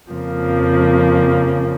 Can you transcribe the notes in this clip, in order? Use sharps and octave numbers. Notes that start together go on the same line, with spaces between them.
F2 C#3 F3 A#3